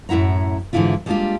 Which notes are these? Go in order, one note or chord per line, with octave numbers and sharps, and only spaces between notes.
F#2 A2 E4 F#5 A#5
G#2 D3 E3 F#3 E4 F4
G3 G#3 A#3 D4 F4 G4